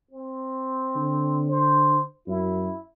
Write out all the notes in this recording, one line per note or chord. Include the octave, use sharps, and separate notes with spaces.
C4
D3
C5
F#2 E4